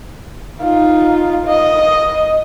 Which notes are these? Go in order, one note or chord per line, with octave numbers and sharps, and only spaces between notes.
D#4 F4
D#5